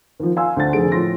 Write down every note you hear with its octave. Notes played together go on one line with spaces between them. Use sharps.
D#2 F3
F5 G#5 C6 E6
D2 C5 A6
F1 D3 G#4 D7
A2 F3 C6 A#6